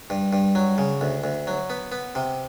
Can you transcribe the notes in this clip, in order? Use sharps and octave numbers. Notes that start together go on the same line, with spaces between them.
G2
G2
F#3
C#3
D2
D2
F#3
B3
B3
C3